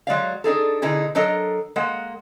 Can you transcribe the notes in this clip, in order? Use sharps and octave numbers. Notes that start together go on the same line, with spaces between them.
F#3 G#3 D5 F5
D4 D#4 G#4 A4
B2 D3 D#4 E4 G#4
F#3 D4 A4 A#4 D#5
G#3 A#3 F#5